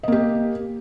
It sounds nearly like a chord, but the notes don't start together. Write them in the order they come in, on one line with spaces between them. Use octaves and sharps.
D#5 A#3 G4